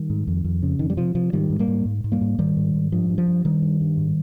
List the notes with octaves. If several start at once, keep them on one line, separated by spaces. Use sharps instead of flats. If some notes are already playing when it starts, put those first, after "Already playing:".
Already playing: D#3 G3
G#2
F2
F2
C#3
F2 D#3
G3
C3 F3
C3 F3
G#2 D#3 G3
G#2
G3 A#3
G#2
G#2
G#2
G3 A#3
G#2
G#2 D#3 G3
G#2
G#2
G2 F3
G2
F3
G2
G2 D#3 G3
G2
G2
G#2